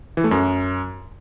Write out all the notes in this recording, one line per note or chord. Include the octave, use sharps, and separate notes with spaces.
E3
A3
F#2